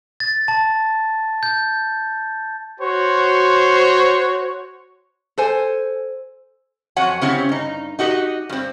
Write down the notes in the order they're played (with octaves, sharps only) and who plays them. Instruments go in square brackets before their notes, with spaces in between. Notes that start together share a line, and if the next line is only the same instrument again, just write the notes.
[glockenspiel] A6
A5
G6
[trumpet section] F#4 C5 C#5
[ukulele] A4 C5 G#5
[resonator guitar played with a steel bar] F2 F#3 F#4 C#5 F#5 G#5
C#3 C4 C#4 E4 G4 C#5
G2 D#4
D#4 F#4 G4 C#5 D#5
G2 C4